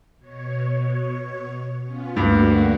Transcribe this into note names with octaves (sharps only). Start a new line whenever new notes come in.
B2 C#5
B3 C#4 F4
D2 G2 A#3 F#4